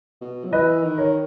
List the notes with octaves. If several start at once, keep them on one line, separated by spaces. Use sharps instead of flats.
B2
F#3
E3 B4 D#5
D#3
A#4 C#5